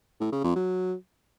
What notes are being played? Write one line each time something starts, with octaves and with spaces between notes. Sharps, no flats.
A2
C#3
F2
F#3